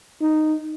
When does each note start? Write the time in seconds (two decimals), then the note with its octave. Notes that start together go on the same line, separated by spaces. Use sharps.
0.21 D#4